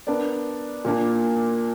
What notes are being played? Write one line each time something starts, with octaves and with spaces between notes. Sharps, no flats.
B3 D4 A#4 D5
A#2 A#3 D4